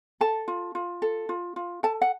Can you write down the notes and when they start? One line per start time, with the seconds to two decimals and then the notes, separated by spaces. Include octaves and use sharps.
0.21 A4 A5
0.48 F4
0.75 F4
1.02 A4
1.29 F4
1.56 F4
1.83 A4 A5
2.01 F#5